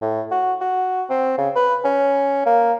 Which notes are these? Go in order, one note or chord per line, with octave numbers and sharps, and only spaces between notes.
A2
F#4
F#4
C4
C#3
B4
C#4
A#3